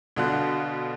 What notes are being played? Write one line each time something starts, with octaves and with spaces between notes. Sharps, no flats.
B2 D3 F5 F#6